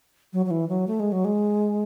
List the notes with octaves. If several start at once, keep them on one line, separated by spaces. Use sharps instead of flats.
F#3
F#3
E3
F#3
A3
G#3
F#3
G#3